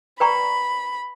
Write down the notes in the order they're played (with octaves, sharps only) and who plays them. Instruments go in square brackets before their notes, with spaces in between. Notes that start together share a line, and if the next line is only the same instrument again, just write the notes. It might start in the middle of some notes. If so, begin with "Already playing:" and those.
[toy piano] B4 D5 G5 A#5 C#6 [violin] B5